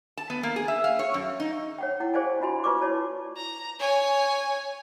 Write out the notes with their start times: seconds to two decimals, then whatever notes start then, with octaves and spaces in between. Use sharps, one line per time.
0.18 A5
0.30 B3
0.43 A#3
0.56 G#4
0.68 E5
0.84 F5
0.99 C#5
1.14 F#2
1.40 D#4
1.78 C#5 F#5 G5
2.00 E4 F#5
2.14 G4 G#4 C5 D5 F5 G#5
2.40 D4 F4 F#4 D#5 G#5 C6
2.64 F4 B4 D5 C#6 D6
2.81 E4 F#4 C#5 D5 A5
3.37 A#5
3.79 C#5 G#5